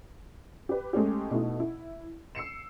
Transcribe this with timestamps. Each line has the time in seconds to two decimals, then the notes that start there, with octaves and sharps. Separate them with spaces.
0.69 G4 B4
0.93 G#3 A3 C#4 G4
1.30 B2 A3 D#4 E4
1.60 E4
2.35 E6 C7 C#7 E7